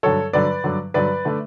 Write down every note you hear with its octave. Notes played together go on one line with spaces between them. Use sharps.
G2 D3 F#3 A4 C#5
G2 D3 F#3 B4 D5
G2 D3 F#3
G2 D3 F#3 B4 D5
D3 A3